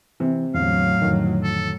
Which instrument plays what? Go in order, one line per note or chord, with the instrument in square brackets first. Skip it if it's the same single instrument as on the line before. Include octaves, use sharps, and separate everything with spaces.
[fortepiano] C3 [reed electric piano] E3
[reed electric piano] E2 D3 [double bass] A2 F#3 [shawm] F5
[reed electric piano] F2 D3 D#3
[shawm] A4